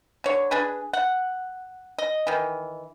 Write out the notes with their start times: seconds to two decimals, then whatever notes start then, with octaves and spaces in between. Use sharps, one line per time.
0.24 D3 C#5
0.51 D4 G#4 B4
0.93 F#5
1.98 D#5
2.27 D#3 E3